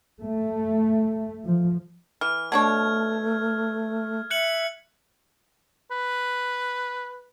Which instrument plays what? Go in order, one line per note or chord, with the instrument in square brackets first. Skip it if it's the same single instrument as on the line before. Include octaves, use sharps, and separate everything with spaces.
[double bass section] A3
F3
[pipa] E3 [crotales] F6
[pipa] B2 D4 C#5 [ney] A3 [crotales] G#6
[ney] E5 [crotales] F#6 C#7 F#7
[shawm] B4